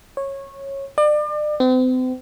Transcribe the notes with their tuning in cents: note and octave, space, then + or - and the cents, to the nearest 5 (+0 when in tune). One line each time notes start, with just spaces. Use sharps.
C#5 -15
D5 +35
C4 -40